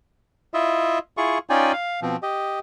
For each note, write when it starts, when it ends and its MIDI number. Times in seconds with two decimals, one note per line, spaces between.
0.54 0.99 64
0.54 0.99 65
0.54 0.99 75
0.54 0.99 76
1.17 1.38 64
1.17 1.38 65
1.17 1.38 68
1.17 1.38 85
1.50 1.72 61
1.50 1.72 63
1.50 1.72 65
1.50 1.72 74
1.50 1.72 79
1.50 1.72 80
1.73 2.00 77
2.02 2.16 47
2.02 2.16 53
2.02 2.16 60
2.23 2.59 67
2.23 2.59 75